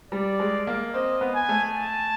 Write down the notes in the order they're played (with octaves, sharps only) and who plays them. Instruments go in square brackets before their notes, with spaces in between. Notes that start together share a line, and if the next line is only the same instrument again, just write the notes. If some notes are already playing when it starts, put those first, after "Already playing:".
[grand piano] G3 [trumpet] D5
[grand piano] G#3
A#3
[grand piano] C4 [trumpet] D#5
[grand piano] B3
[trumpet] G#5
[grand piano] A3
[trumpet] A5